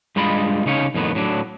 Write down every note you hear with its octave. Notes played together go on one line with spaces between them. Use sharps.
G2 G#3 F4 D#5 B5
C#3 D#4 C#5 F5
F2 A2 D#3 B3
A2 F#3 D4